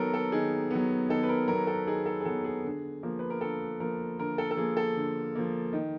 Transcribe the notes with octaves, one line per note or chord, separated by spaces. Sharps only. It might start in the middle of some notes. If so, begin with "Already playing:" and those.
Already playing: D#3 F#3 B3 A4 A#4
A4
D#3 G#4
F#3 B3
D#3 A4
B4
A#4
F#3 B3 A#4
A4
D#3 G#4
A4
G#4
F#3 B3 A4
G#4
D3
F3 A#3
B4
A#4
D3 A4
F3 A#3 A#4
D3 A#4
A4
A4
F3 A#3 G#4
A4
D3
F3 A#3
D#3